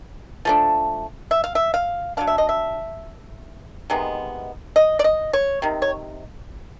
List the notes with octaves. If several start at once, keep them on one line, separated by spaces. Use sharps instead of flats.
F3 A3 D4
E5
F5
E5
F5
F#3 B3 D4 F5
E5
D#5
E5
C3 D#3 G#3 B3
D#5
D5
D#5
C#5
C3 D#3
C#5